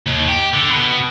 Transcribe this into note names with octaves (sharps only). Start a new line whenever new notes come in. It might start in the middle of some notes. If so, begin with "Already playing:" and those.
D#2
G4
D3
B2